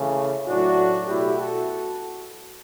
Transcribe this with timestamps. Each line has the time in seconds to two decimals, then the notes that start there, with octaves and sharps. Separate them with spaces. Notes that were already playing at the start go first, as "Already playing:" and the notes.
Already playing: C#3 E3 A3
0.48 A2 F#3 A3 D4 F#4
1.07 B2 A3 E4 G4
1.37 F#4 A4